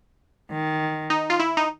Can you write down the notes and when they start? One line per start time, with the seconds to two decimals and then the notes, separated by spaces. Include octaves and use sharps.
0.51 D#3
1.10 D#4
1.30 F4
1.40 E4
1.57 D#4